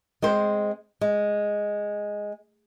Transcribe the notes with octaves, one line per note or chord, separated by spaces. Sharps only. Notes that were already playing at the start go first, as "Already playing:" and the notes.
G#3 C4 C5
G#3